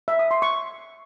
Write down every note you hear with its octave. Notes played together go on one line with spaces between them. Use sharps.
E5
D#6
C6
C#6